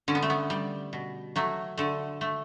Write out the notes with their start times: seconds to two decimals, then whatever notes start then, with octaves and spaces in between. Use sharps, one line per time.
0.08 D3 C#4
0.15 B3
0.22 A3
0.30 B3
0.50 G3
0.93 B2
1.36 F#3 A3
1.78 D3 A3
2.21 A3